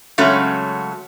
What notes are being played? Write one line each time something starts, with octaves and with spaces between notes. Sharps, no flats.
C#3 F#3 G#3 A3 C#4 F#4